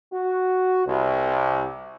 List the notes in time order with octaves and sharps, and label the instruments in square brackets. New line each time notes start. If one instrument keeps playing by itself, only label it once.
[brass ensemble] F#4
C2